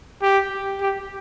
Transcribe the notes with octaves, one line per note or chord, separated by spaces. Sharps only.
G4
G4